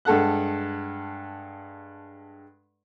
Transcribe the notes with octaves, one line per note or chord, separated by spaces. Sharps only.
G2 G#3 A4 F#5 F#6